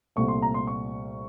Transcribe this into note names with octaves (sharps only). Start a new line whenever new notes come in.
C2 A#2 A3 C#6
C6
A#5
C6
C#6